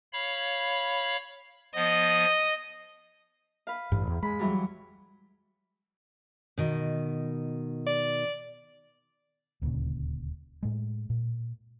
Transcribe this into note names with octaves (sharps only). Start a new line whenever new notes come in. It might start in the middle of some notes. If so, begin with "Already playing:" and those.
C#5 F5 B5
F3 B3 D#5
B4 F5
A1 G2
E2
G#3 B5
E3 F#3 G3
B2 D#3
D5
D#1 D2 A#2 C#3
A2 G#3
A#2